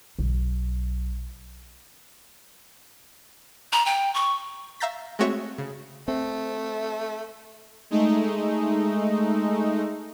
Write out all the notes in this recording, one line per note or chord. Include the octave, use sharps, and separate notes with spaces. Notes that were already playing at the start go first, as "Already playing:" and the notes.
B1
A#5
G5
C#6
E5 F5 A#5 G6 A6 B6
G#3 A3 C4 F#4 C#5 E5
C#3
A3 C4
G#3 A3 D#4